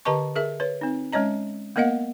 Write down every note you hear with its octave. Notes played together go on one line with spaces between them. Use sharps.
D3 G4 B4 D#5 A5 C#6
G#4 A#4 E5
B4 C#5
C4 D#4
G#3 C#4 C#5 D#5 A#5
A#3 B3 A#4 D#5 F5 F#5